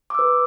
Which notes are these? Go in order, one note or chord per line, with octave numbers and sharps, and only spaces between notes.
B4 D6 E6